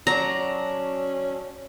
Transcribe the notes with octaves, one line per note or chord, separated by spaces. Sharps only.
F#3 C#4 D4 A#5